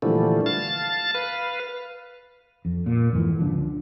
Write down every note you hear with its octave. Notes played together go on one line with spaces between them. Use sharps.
A#2 D3 E3 F3 G3 A3
F5 A5 A6
B4 F5
F2
A#2
G#1 F2 G#2 E3
C#2 D3 F3